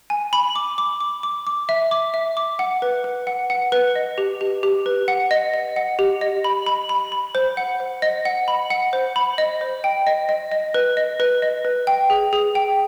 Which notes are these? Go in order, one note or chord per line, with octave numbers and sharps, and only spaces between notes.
G#5
B5
D6
D6
D6
D6
D6
E5
D6
E5
D6
F#5
B4
B4
F#5
F#5
B4
D#5
G4
G4
G4
B4
F#5
D#5
D#5
F#5
G4
D#5
B5
B5
B5
B5
C5
F#5
C5
D#5
F#5
B5
F#5
C5
B5
D#5
C5
G5
D#5
D#5
D#5
B4
D#5
B4
D#5
B4
G5
G#4
G#4
G5